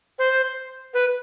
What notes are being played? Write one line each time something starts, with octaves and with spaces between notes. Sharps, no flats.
C5
B4